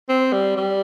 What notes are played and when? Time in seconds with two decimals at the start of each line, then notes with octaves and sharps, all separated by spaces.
0.09 C4
0.33 G3
0.56 G3